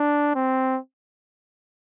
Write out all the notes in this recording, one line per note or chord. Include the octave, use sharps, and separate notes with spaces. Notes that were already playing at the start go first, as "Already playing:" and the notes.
Already playing: D4
C4